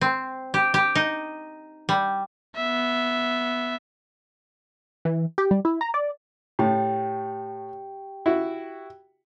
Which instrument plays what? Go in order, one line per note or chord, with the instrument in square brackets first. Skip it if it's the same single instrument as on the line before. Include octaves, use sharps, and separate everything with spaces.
[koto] C4
G4
G4
D#4
G3
[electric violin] B3 E5
[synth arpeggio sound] E3
G4
G3
E4
A#5
D5
[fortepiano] A2 [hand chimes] G4 G5
[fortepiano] E4 F#4